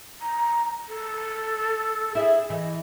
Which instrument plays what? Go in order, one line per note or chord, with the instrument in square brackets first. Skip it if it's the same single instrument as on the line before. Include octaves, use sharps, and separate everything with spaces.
[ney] A#5
A4
[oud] E4 E5 [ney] G#4
[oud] E3 [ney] D#5